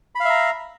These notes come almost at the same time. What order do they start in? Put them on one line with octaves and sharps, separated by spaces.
B5 F5 E5 A#5